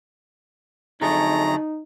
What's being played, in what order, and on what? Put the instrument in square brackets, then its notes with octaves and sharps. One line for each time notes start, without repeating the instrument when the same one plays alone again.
[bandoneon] F2 A3 G#4 [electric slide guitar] D3 F#3 A4 [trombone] D#4 [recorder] A#5